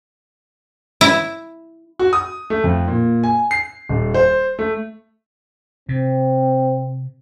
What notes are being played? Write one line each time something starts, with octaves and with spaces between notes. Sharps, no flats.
E4
F#4
D#6
A3
F2
A#2
G#5
C7
D#1
C5
A3
C3 C4